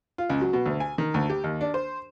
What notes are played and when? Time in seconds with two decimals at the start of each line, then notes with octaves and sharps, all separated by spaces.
0.18 F4
0.29 C#2
0.41 F#3
0.53 B2
0.66 D2
0.80 G#5
0.98 D#3
1.14 D2
1.30 G4
1.44 D#2
1.61 D4
1.74 C5